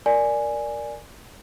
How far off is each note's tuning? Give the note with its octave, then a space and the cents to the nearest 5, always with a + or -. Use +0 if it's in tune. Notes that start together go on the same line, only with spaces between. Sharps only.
A#4 +0 D5 +0 G#5 +0